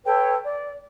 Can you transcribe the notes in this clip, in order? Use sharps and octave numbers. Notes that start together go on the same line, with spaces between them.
A4 B4 C#5 G5
D5